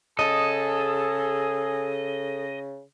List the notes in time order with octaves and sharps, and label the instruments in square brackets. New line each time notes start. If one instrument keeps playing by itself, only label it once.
[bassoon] C#3 [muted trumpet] G#4 [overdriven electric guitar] A4 [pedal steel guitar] D#5